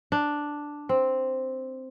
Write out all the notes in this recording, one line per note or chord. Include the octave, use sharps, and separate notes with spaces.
D4
C4